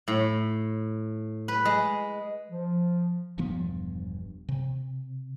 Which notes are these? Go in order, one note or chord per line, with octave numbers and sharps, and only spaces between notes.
A2
B4
G#3
F3
E1 G2 F3 B3
C3